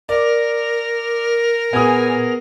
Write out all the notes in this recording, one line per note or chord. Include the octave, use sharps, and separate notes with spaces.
A#4 D5
A#2 B3 G#4 G#5 D#6